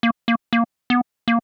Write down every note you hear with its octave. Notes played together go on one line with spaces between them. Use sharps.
A#3
A#3
A#3
B3
A#3